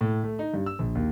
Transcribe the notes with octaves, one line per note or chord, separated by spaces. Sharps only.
A2
A3
D#4
G2
E6
A#1
D#2